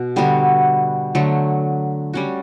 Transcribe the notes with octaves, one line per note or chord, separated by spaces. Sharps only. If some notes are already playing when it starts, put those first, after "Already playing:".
Already playing: B2
D3 G3 B3 F#4
D3 F#3 A3
G3 C#4 F#4